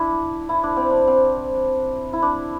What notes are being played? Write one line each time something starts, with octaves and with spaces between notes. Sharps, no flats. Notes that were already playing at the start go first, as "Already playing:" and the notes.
Already playing: D4 E4
E4
D4
C4
D4
C4
E4
D4